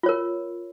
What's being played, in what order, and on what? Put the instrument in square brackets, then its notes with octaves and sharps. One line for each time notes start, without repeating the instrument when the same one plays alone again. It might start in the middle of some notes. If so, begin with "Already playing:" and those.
[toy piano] F4
C#5
A#4